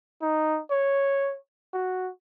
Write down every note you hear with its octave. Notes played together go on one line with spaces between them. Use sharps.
D#4
C#5
F#4